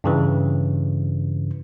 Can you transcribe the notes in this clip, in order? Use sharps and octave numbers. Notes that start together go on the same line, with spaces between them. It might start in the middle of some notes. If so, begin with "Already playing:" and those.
G2 C#3 E3